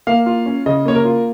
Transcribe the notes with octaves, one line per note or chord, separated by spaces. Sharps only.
A#3 F5
F4
C#4
C#3 D#5
A#3 C#5
A#4
F4